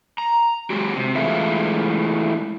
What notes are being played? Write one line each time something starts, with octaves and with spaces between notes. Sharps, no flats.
A#5
G#3 F#4 G4
C3
E3 G#3 A3 E4 F4